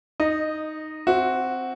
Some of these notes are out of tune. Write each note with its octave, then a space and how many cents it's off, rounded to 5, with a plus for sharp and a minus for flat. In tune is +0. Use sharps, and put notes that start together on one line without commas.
D#4 +0 D#5 -15
C4 +0 F#4 +0 E5 +0